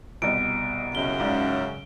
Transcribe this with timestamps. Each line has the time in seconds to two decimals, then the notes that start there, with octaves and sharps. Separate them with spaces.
0.22 C2 B2 D#5 D7
0.95 F#2 C#3 G7
1.20 C#2 G#2 D5